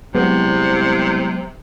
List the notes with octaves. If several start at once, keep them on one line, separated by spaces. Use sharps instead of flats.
C2 C3 F#3 G#3 B3